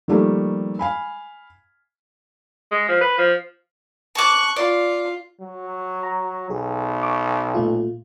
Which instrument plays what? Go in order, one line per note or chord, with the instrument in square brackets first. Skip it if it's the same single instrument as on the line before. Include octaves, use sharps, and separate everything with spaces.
[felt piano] D#3 F3 G3 A3 A#3
F5 G#5 B5
[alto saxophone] G#3
F3
B4
F3
[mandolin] A5 D6 [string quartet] C#6 F#6
[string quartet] F4 [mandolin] D5
[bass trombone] F#3
[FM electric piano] A#5
[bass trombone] B1 [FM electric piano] G#4
[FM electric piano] C#6 D6
A#2 A3 F4